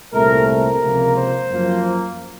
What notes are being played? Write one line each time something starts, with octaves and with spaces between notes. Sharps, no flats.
C2 A#2 A3 C4 A#4
A#4
C#2 C3 F3 A#3
C5
F#2 F3 A#3